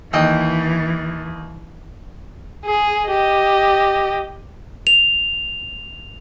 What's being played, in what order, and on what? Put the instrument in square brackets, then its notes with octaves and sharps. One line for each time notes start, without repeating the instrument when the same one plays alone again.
[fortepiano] D#2 D#5 G5 [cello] E3
[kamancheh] G#4
G4 D#5
[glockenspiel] F7